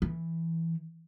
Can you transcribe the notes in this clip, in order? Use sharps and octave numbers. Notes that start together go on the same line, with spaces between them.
E3